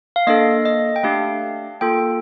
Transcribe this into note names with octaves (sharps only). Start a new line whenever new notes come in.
F5
A#3 D4 A4 D#5
D#5
G5
A3 D4 G4 F5
A#3 F4 A4 G5